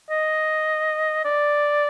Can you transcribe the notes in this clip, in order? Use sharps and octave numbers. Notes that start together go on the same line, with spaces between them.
D#5
D5